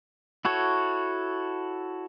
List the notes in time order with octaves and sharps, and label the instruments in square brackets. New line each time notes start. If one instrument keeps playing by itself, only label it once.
[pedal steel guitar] E4 F#4 A4 C#5